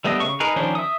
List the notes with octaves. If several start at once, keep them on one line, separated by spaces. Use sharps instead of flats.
G3 A3 B3 D4 D#5
C#3 C#6
D#4 G#4 A#4 B4
D#3 F3 C#4 D4 C5
E5 D#6